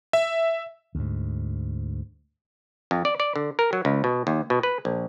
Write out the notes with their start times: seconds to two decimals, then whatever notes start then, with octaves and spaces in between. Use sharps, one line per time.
0.13 E5
0.95 D2 G#2
2.91 F2
3.05 D5
3.20 D5
3.36 D3
3.59 A#4
3.73 F#3
3.85 C#2
4.04 B2
4.27 D#2
4.50 B2
4.63 B4
4.85 A#1